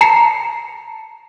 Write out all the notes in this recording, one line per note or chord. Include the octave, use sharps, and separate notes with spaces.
A5 A#5 C7 C#7